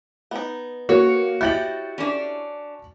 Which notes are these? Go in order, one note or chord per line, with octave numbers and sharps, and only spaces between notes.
B3 D#4
A#3 F#4 C#5
E4 G4 D#5 G6 A6 F#7
C#4 D4